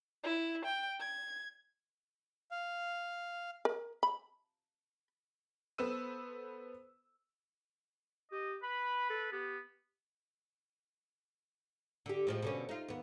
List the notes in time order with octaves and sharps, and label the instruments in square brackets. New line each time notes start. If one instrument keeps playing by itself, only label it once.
[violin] E4
G5
G#6
[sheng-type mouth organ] F5
[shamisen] A#4
B5
[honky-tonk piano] B3 A4 B4 C5 E6 D#7
[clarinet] G4 [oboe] D#5
[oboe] B4 [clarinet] B5
[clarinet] A4
[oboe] B3 [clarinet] G4
[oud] D3 G4
A2 F3 G#3
B2 D3 C#4
D#4 F4
D#2 B3